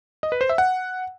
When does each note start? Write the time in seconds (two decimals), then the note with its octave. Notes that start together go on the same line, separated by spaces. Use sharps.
0.23 D#5
0.32 B4
0.41 C5
0.49 E5
0.58 F#5